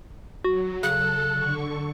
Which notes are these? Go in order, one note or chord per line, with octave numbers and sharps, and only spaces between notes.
F#3 F#4
C#3 A4 F#6
D3 C#6